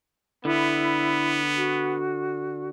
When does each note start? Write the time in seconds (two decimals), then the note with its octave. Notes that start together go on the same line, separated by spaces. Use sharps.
0.45 D3 B3 E4
1.57 F#4